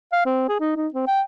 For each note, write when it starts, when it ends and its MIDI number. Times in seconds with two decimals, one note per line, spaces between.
0.13 0.24 77
0.26 0.45 60
0.49 0.56 68
0.60 0.73 63
0.76 0.88 63
0.94 1.06 60
1.07 1.22 79